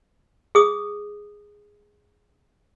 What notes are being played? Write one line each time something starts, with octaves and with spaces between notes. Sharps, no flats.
G#4 D#6